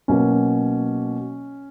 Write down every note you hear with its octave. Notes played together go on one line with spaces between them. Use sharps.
B2 F#3 A#3 C#4